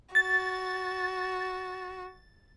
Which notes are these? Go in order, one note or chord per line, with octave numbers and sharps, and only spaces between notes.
F#4 A6